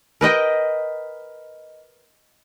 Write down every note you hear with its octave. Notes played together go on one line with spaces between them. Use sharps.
A#4 B4 D#5 G5